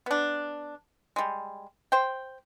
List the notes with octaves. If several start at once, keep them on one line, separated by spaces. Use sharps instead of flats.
B3 D4
G3 G#3
C5 G5